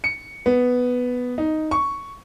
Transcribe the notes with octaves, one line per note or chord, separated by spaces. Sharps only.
C#7
B3
D#4
C#6